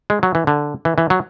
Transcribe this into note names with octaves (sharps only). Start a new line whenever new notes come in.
G#3
F#3
E3
D3
E3
E3
F#3